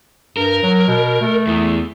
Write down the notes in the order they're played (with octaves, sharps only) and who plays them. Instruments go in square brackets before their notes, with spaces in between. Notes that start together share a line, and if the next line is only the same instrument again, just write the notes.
[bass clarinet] G2 [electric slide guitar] A#4
[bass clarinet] F#3
B2
A3
[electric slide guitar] E2